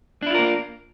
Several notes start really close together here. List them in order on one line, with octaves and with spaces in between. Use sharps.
D4 E4 F4 A#4 A#3